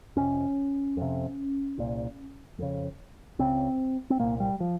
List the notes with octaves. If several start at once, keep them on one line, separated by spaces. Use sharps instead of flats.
F2 C3 C#4
F2 C3
C2 A#2
F2 C#3
C#2 C#3 C4
C4
C2 A#2 A#3
G3
F3